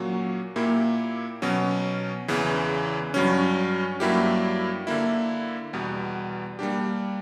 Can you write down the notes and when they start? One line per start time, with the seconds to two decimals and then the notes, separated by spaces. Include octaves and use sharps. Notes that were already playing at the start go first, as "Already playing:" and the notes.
Already playing: A#2 F#3 A#3 C#4 F#4
0.56 A#2 A#3 E4 G4
1.42 B2 F#3 C#4
2.28 E2 C#3 E3
3.14 G2 F#3 C#4
4.00 G2 F#3 A#3 E4 G4
4.87 D3 A#3 E4
5.73 E2 B2 G3 B3
6.59 G3 A#3 D4 G4